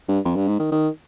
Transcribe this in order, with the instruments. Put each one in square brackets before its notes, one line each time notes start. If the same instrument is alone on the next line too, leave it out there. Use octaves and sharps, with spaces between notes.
[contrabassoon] G2
F2
G2
G#2
D#3
D#3